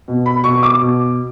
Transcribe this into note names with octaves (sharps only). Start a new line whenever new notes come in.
B2
B5
B2 C#6
D6
B2